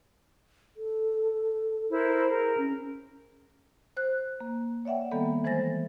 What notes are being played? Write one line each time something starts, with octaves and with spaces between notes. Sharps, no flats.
A4
E4 A#4 C5
G#4 A#4
C#4
C5 F#6
A#3
C#5 D5 E5 F#5 G5
D#3 G3 A#3 B3 A4
E3 G#3 C5 G#5 A6 A#6